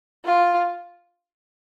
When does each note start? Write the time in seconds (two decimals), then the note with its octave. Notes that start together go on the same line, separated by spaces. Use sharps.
0.25 F4